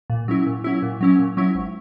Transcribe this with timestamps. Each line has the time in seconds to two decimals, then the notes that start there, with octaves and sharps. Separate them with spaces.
0.10 A#2
0.28 F#3 C#4 E4
0.46 A#2
0.64 F#3 C#4 E4
0.82 A#2
1.01 F#3 C#4 E4
1.19 A#2
1.37 F#3 C#4 E4
1.55 G#1